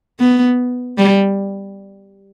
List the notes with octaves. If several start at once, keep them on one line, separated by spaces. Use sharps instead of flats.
B3
G3